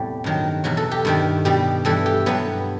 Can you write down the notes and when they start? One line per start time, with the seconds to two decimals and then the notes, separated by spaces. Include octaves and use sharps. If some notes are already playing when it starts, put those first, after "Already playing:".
Already playing: E2 A2 C3 G3 G4
0.24 G2 D#3 F#3
0.64 E2 B2 F#3 F#4
0.77 A4
0.91 G4
1.05 G2 D#3 G3
1.45 B2 G3 G4
1.85 G2 E3 G3 A4
2.06 G4
2.26 G2 F#3 B3